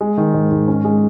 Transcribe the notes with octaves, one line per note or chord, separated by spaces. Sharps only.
G#3
D#3
G#2
G#2
C#4
G#3